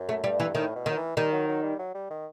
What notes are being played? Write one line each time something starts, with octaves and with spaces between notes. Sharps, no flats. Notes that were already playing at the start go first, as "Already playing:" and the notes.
Already playing: F#2
A3
G2 G3
E3
A2 D#3
B2
D#3 F#3
E3
D#3 G3
F#3
F#3
G3
F#3
G3
D#3